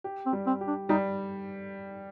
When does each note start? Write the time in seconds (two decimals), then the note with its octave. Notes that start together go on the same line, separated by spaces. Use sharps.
0.04 G4
0.26 C4
0.33 G3
0.46 C4
0.61 G4
0.67 D4
0.89 G3 D#4